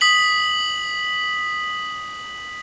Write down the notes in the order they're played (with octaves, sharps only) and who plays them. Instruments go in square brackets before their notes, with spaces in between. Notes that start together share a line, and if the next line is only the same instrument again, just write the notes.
[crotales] D#6 B6 F#7